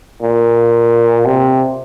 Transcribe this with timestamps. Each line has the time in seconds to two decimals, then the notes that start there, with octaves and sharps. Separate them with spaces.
0.22 A#2
1.26 C3